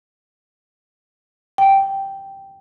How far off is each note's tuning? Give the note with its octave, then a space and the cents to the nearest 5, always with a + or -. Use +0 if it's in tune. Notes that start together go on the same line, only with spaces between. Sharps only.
G5 -5